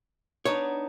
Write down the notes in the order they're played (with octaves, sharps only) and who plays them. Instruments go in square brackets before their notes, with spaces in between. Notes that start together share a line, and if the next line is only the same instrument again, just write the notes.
[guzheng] B3 D4 D#4 [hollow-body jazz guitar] C#5